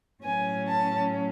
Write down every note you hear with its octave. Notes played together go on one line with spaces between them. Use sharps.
A2 F#3 C#4 G#5
A5